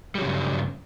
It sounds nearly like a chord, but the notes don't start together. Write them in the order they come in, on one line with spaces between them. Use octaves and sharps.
G3 F#3 C#3 G2